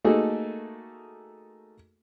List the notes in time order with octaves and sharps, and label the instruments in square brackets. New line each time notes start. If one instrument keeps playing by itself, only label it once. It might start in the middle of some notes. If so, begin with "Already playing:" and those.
[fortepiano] A3 A#3 D#4 F#4 G#4 A4